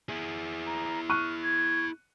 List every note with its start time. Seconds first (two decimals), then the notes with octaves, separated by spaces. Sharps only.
0.09 E4 G#4
0.67 A#5
1.10 C#6 F6 F#6 D#7
1.43 G#6